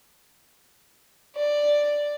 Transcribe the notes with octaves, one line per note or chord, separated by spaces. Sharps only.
D5